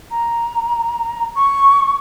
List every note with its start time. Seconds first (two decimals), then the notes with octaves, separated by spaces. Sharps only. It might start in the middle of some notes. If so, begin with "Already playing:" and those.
0.11 A#5
1.36 C#6